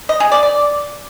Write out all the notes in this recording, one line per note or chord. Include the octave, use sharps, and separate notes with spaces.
D#5
G#4
D5
D5